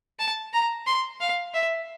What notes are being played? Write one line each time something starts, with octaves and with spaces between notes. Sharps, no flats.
A5
A#5
C6
F5
E5